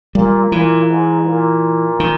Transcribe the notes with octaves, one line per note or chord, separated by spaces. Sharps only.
A#2 G3
A#2 E3
G#2
A#2
D#3